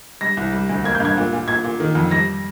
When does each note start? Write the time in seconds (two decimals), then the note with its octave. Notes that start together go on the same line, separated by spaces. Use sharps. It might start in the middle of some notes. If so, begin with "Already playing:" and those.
0.21 G3 A#6
0.37 C2
0.52 G3
0.69 D2
0.84 A#3 G#6
0.95 G6
1.00 G2 G#6
1.17 A#2
1.32 A#2
1.48 A#2 G#6
1.64 A#2
1.80 D#3
1.95 F2
2.11 G3 A#6